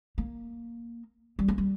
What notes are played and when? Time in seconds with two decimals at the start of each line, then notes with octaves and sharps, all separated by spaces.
0.18 A#3
1.39 G3
1.48 A#3
1.58 G3